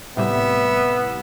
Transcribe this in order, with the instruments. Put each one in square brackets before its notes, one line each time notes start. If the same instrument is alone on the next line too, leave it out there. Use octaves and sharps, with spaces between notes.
[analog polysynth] A2 C3 G3 [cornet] B3 [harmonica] E5